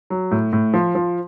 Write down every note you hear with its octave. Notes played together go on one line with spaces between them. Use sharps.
F#3
A2
A2
F3
F3